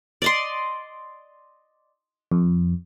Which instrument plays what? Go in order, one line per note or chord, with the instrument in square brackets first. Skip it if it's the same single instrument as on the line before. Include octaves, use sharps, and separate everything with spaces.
[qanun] D5 D#5 C6
[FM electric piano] F2